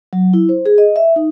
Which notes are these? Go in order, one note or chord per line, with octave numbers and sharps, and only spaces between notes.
F#3
E4
C5
G#4
D#5
E5
D#4